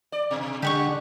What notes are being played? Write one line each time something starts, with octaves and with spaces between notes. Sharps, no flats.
D5
B2
D3 G3 G4 F#5 C#6